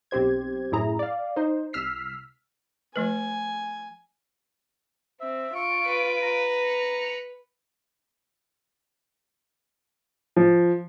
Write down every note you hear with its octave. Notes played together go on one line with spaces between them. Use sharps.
B1 C4 G4 C5 G#6
F#2 A2 E4 G#4 A#5
D5 F5
D#4 C5
C2 E6 F6 B6 C7
F3 A3 B4 G#5
C4 E5
F4 C#6 D7
B4
A#5
C#7 F7
F3